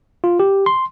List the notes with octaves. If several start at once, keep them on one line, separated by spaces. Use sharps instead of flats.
F4
G4
C6